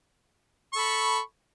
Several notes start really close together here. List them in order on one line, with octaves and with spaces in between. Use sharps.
C#6 A4 B5